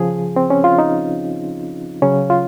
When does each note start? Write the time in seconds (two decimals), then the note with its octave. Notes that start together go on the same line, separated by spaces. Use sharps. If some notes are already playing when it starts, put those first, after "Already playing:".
Already playing: C#3 F3 G#4
0.36 C4
0.50 C#4
0.64 F4
0.79 D#4
2.02 C#3 F#3 C#4
2.30 F4